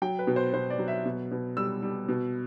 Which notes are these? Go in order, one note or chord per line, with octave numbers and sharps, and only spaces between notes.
F#3 G5
B4
B2
C5
B2 C5
D5
F#3
E5
B2
B2
G3 E6
G3
B2